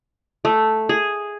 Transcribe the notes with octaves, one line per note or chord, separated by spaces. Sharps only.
A3
G#4